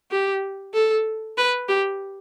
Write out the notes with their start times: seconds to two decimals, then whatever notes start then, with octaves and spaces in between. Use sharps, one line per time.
0.11 G4
0.74 A4
1.37 B4
1.69 G4